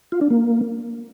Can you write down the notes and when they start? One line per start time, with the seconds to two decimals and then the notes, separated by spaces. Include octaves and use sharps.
0.12 F4
0.21 D4
0.30 A#3